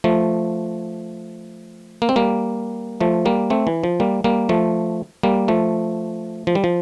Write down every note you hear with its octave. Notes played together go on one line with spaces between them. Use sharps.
F3 A3
A#3
C4
G3 A#3
F3 A3
G3 A#3
A3 C4
E3
F3
G3 A#3
G3 A#3
F3 A3
G3 A#3
F3 A3
F3
G3
F3